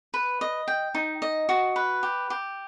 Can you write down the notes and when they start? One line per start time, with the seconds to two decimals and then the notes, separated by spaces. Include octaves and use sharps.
0.14 B4
0.41 D#5
0.68 G5
0.95 D#4
1.22 D#5
1.49 F#4
1.76 B4
2.03 G4
2.30 G4